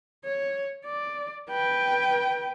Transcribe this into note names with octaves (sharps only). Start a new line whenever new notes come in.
C#5
D5
B4 G5